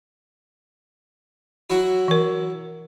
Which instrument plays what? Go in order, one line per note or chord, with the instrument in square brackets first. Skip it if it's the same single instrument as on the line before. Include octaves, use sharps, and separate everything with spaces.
[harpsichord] F#3 E4 F#4
[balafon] E3 A#4